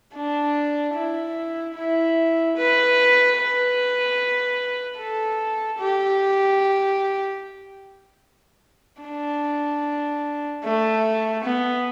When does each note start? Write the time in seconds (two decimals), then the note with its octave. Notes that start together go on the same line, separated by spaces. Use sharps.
0.14 D4
0.94 E4
1.75 E4
2.57 B4
3.37 B4
4.98 A4
5.79 G4
9.02 D4
10.64 A3
11.44 B3